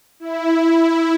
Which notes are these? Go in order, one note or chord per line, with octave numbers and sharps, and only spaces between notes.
E4